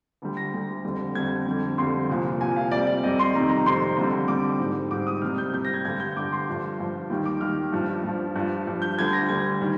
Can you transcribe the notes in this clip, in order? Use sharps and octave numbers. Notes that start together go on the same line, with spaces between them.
D2 D3 G3
A#6
D2 D3 G3
F2 D3 G3
F2 D3 G3 G#6
F2 D3 G3
F2 D3 G3 C6
C2 A#2 F3
C2 A#2 F3 G#5
F5
F2 C3 G3 D5
D5
F2 C3 G3 D#5
C6
F2 C3 D#3 G3 A#5
A#5
F2 C3 D#3 G3 C6
F2 D3 G3
F2 D3 G3 D6
G#2 G3
G#2 G3 D6
D#6
C2 C3 G3 F6
G6
C2 C3 G3 G6
A#6
G#6
G2 D3 G3 G#6
G6
G2 D3 G3 D6
C6
G2 F3
G2 F3
D#2 D#3 G3 G5
D6
D#2 D#3 G3 F6
G2 F3
G2 F3
G2 F3
G2 F3
G6
D2 D3 G3 G#6
A#6
D2 D3 G3 G#6
D#3 G3